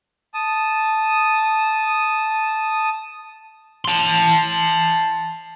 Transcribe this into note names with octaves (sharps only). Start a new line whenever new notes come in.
A5 D#6
A5 C6